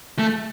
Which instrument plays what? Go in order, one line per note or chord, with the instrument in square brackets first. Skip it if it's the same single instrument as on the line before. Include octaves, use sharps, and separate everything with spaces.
[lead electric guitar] A3